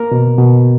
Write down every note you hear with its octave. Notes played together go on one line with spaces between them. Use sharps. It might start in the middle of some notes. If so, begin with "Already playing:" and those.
Already playing: A#3 A#4
B2
B2